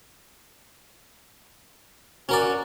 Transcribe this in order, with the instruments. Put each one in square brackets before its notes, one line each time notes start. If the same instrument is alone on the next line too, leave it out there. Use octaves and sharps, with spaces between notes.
[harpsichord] C#4 A#4 D5 [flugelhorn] F#4